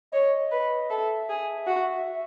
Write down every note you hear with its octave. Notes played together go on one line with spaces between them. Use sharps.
C#5 D#5
B4
A4 E5
G#4
F#4